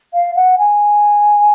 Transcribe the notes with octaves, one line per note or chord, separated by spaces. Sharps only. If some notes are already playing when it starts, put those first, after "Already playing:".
F5
F#5
G#5